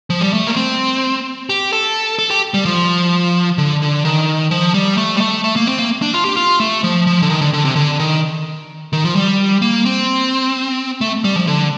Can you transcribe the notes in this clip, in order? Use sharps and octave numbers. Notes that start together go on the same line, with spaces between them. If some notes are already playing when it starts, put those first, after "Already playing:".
F3
G3
A3
A#3
C4
G4
A4
A4
G4
G3
F3
D3
D3
D#3
F3
G3
A3
G3
A3
A3
A#3
C4
A#3
D4
F4
G4
F4
A3
F3
F3
D3
D#3
D3
D3
C3
D3
D#3
D#3
F3
G3
A#3
C4
A3
G3
F3
D3